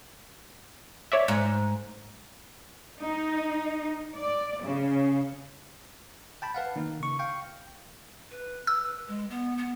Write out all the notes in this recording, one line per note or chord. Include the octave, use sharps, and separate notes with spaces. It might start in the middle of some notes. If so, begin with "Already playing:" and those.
C#5 D5 E5
G#2
D#4
D5
C#3
G5 A5 B5
B4 F5 F#5
D#3 A#3 D#4
C#3 C#6
F5 G5 C#6
B4
E6
G#3
B3
B3